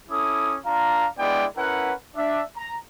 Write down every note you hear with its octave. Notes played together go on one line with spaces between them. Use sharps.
C#4 E4 A4 D6 D#6
D4 F4 F5 A#5
G#3 B3 D4 E4 D5 G5
C#4 E4 A#4 B4 F#5
D4 E5
A#5